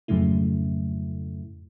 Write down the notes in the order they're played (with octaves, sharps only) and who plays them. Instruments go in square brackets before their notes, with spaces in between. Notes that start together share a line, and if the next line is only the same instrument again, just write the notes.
[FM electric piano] F2 G#2 C#3 F#3 A3 E4